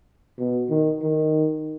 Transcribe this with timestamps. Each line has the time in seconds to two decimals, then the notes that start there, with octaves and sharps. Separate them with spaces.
0.38 B2
0.70 D#3
1.02 D#3